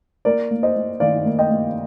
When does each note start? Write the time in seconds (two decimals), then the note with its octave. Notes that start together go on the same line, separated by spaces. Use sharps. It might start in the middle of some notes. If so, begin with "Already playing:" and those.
0.25 A#3 A#4 D5
0.51 A#3
0.63 C5 D#5
0.76 A#3
1.00 D#3 D5 F5
1.25 A#3
1.39 D#5 G5
1.51 A#3